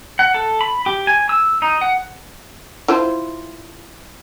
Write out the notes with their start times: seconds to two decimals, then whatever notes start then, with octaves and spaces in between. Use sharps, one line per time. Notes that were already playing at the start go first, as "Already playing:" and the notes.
0.19 F#5
0.34 A4
0.61 B5
0.86 G4
1.07 G#5
1.29 E6
1.62 D#4
1.81 F#5
2.88 E4 F4 C5